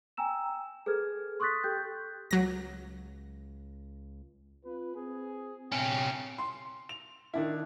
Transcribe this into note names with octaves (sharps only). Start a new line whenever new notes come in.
G5 G#5 A#5 E6 E7
G#4 A4 B4 F6 G#6
C6 C#6 D#6 F#6 A6 B6
G4 A4 G5 F#6 G6
C#2 F#3 A#6
C4 F4 B4
C4 G#4
G1 G2 C3 C#4 G5
C6
F7
D#3 D4 E4